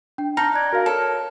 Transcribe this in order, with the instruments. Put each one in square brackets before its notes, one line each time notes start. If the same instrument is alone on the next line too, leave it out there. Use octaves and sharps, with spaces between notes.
[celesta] D4 G5
[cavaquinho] D#4 [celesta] A5 F6 A#6
[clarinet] D5 [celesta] F#6 G#6
[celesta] F#4 F5 [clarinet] A#4
[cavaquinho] A4 [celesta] C#5